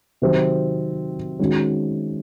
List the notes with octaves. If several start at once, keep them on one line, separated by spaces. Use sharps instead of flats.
C3 D#3 F#3 C4
D#3 G#3 C#4 F#4